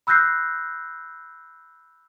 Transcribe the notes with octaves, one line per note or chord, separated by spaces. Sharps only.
B5 E6 F#6 G6 A#6 C7